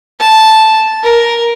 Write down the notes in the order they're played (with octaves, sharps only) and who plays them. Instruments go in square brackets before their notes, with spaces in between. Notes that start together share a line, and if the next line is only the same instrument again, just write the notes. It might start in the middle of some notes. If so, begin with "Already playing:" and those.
[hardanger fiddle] A5
A#4